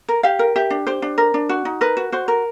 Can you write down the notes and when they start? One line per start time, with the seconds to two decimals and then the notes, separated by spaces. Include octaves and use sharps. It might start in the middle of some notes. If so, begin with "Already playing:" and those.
0.08 A#4
0.23 G4 F5
0.39 A#4
0.56 G4 E5
0.70 D4
0.87 G4 C5
1.02 D4
1.18 A#4
1.34 D4
1.49 F#4
1.65 D#4
1.81 A#4 B4
1.97 F#4
2.12 F#4 C5
2.28 A#4